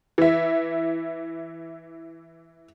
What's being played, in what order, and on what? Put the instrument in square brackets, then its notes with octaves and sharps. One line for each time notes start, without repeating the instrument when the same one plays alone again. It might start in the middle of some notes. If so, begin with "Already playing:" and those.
[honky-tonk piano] E3 E5